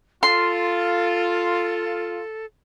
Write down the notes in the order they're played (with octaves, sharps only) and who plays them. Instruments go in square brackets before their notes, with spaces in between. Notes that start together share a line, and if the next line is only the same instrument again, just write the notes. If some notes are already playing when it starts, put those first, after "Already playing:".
[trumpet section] F4 [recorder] A4 [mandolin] C6